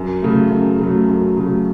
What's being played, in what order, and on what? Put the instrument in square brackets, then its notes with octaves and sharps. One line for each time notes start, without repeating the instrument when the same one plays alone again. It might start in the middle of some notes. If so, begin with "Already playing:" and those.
Already playing: [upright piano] F#2
C#3 F#3 A3
F#2
C#3 F#3 A3
F#2
C#3 F#3 A3